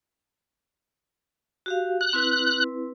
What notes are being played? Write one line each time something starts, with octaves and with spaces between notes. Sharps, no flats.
F#4 G4 F5
F#6
C4 E4 B4